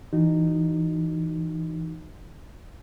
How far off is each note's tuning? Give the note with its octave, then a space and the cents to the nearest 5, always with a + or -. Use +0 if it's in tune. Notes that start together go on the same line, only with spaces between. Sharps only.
E3 +0 D#4 -15 F#4 +0